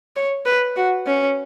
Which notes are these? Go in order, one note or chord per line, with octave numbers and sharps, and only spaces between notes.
C#5
B4
F#4
C#4